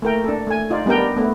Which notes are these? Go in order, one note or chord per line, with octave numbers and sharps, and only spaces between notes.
A3 A#3 A#4 G5
D4 A4
A3 G#5
D#4 F4 D5
G3 B3 D4 A#4 G5
A3 B3